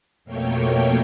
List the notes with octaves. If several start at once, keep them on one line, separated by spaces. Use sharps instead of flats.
F2 B2 A3 A#3 C#5 G5